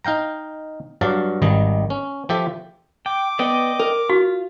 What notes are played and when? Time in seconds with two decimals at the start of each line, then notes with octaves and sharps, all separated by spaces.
0.04 D#4 F5 G5 A#5
1.01 G2 F#3 D5 F5 A5
1.42 G#1 D#3 G3 D#5
1.90 C#4
2.29 F3 G4 A4 E5
3.06 G5 D6
3.39 B3 D5 D#5 G5
3.79 A#4
4.10 F4 F#4